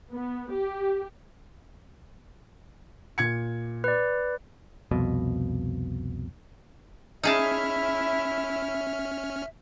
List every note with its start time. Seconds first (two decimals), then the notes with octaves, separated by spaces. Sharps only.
0.12 B3
0.52 G4
3.18 A#2 G#6 C#7
3.84 B4 D5
4.91 C2 F2 B2
7.23 C#4 D#4 E4 G#4 E5 A5 F6